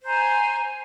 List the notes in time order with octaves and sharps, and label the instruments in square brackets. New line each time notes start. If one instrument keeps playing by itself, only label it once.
[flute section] C5 G#5 A#5